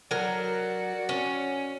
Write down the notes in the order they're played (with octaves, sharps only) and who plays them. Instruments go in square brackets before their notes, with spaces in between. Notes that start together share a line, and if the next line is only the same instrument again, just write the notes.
[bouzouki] F#3 A#4 [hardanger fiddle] F#4 D5
[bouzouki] C#4